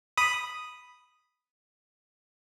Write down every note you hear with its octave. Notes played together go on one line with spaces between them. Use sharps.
B5 D#6